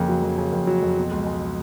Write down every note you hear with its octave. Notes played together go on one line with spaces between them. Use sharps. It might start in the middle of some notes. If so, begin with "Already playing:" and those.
Already playing: F2 C#3 A#3
F#3
F2
C#3
F2
F#3
F2
B2
C#2
G#3